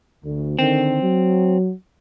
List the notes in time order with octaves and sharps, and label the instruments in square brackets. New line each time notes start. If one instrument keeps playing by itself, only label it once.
[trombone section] D2
[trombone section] D3 D#3 [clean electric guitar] C4
[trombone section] F#3